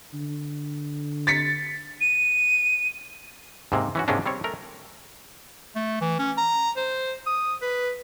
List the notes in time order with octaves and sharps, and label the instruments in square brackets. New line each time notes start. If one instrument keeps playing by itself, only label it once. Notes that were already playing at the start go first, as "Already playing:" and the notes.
[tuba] D3
[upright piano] A6 B6 C#7
[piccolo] D#7
[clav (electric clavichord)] G#2 C3 A#3
E3 C#4 F#4
G#2 C3 G#3 A#3 C#4 D4
G3 C4 C#5
A3 A#4
[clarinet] A3
E3
C#4
A#5
C5
D#6
B4